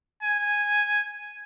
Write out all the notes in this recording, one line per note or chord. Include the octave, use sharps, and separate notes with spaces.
G#5